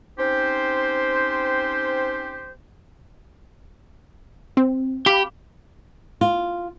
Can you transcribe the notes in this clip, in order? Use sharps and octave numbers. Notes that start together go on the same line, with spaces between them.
C4 C#4 D#4 G4 C5
C4
G4 F5 B5 D6
F4